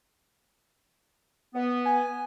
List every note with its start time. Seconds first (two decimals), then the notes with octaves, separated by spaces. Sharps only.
1.54 B3
1.85 G#5